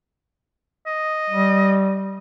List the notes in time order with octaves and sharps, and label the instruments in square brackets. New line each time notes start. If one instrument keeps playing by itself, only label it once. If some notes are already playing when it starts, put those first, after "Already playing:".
[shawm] D#5
[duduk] G3